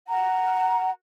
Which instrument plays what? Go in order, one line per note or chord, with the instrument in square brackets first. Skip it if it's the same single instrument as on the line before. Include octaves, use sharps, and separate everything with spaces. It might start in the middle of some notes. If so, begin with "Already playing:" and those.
[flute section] F#5 A#5